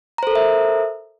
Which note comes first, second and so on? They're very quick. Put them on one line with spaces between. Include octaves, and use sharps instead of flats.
A#5 C5 A4 A#4 E5